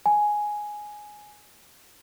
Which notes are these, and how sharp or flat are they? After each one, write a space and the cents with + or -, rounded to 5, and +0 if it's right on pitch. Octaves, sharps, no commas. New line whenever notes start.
G#5 +5